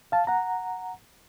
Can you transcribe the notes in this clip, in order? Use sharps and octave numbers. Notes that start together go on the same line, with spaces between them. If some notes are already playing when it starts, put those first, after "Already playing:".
F5 A5
F#5 A#5